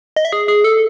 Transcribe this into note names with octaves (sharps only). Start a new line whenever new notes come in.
D#5
E5
G#4
G#4
A4